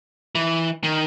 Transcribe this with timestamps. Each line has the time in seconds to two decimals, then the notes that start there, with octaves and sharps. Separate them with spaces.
0.35 E3
0.84 D#3